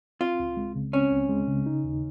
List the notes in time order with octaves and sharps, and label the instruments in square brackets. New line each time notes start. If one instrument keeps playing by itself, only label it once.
[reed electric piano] C4 [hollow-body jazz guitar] F4
[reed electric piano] C#2
G#3
C#3
[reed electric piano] C4 [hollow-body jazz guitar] C#4
[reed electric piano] C#2
G#3
C#3
D#4
D#2